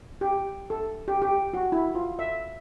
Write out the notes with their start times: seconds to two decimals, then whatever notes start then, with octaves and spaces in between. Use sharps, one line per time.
0.21 G4
0.70 A4
1.08 G4
1.22 G4
1.54 F#4
1.72 E4
1.95 F4
2.19 E5